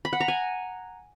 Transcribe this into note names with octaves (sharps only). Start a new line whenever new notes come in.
B5
F#5
A#5
G#5